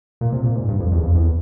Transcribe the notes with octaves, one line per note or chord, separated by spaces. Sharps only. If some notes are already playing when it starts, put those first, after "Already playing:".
A#2
C3
A#2
G#2
G2
F2
E2
F2
E2